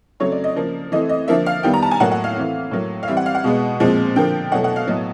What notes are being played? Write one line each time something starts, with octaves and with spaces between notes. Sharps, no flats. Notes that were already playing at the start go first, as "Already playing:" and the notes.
C#3 F#3 A3 C4 C#5
D5
D#5
C#3 F3 A#3
E3 A3 C4 D#5
D#5
D3 F3 A#3 E5
F5
D#3 G3 B3 G5
A#5
A5
G#5
A2 F#3 A#3 F#5
F#5
F5
E3 A3 C4
A2 F#3 A#3
F5
E3 G3 C4 E5
F#5
F5
F#5
B2 G#3 B3
A#2 F3 G#3 C4
D3 F3 A#3 G5
B2 F#3 A3 F#5
F#5
F5
A2 F#3 B3 D#5